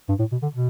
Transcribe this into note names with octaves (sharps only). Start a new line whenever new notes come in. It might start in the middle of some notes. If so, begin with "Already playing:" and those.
G2
A2
B2
D3
B2